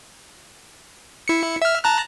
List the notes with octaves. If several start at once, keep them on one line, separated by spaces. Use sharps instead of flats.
E4 C#7
E5 F6
A5 A#5 F#6